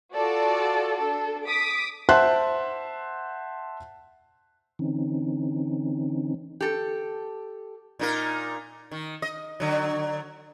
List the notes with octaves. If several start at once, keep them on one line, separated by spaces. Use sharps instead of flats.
F4 F#4 A4 D5
D4 A4
D6 D#6 B6
C5 E5 F#5 A5 C6 F#6
D3 E3 C4 C#4 D#4
G4 A4
A#2 D#4 A#4
D#3
D#5
D3 F#3